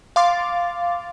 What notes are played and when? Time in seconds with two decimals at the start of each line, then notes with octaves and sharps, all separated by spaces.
0.16 F5 C6 D6 A6